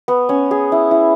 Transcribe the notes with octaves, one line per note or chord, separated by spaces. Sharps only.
B3
C#4
G#4
E4
E4